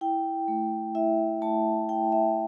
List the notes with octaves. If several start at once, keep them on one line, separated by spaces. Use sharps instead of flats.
E4 G5
A3
E4 E5
A3 A5
E4 G5
E5